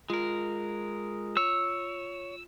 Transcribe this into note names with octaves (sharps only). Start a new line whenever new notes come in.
G#3 F4 A#4
C#5 E6